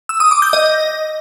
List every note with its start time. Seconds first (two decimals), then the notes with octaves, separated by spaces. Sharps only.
0.09 E6
0.20 D#6
0.31 D6
0.42 G6
0.53 D#5